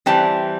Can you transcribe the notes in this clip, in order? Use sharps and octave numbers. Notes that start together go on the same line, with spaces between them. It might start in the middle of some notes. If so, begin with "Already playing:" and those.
E3 G3 C4 A5